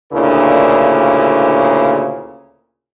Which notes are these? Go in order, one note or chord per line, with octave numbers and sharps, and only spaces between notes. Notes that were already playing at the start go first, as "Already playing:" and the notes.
D2 A#2 C#3 D4 E4 A#4